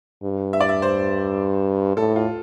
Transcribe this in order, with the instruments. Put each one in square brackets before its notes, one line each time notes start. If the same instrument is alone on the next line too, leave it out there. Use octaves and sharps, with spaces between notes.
[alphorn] G2
[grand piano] E5
D5
E5
C5
[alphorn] A2 [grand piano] A4
[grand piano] F4